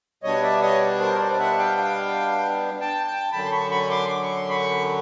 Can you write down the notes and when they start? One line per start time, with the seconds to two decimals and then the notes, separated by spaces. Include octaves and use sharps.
0.23 B2 G3 B3 D4 C#5 D#5
0.43 D5 E5
0.62 C#5 D#5
1.00 A#4 C5
1.15 C#5
1.20 C5 D5
1.39 E5 F#5
1.58 F5 G5
1.77 F5 G5
2.81 G5 A5
3.07 G5 A5
3.32 F#2 D3 F#3 A5 B5
3.45 C6
3.52 B5 C#6
3.71 B5 C#6
3.90 C6 D6
4.10 D6
4.23 C#6
4.36 C6
4.49 B5 C#6